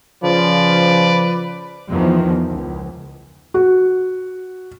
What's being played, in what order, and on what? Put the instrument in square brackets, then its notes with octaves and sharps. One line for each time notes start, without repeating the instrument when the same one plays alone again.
[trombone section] C#3 F3 [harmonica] B4 D5
[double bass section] E2 D#3 F3
C#2
[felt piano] F#4